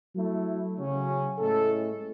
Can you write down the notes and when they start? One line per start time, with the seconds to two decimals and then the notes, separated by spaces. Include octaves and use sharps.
0.15 F#3 A3 E4
0.77 C#3 F#3 C#4
1.38 A2 G#3 C#4 E4 A4